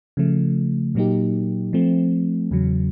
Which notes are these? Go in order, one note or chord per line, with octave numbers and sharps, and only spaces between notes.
C#3 F3 A3
A#2 F#3 A#3 D#4 G4
F3 A3 C4
E2 C#3 F#3